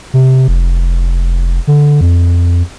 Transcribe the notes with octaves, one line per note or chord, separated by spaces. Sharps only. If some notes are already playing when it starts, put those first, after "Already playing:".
C3
F1
D3
F2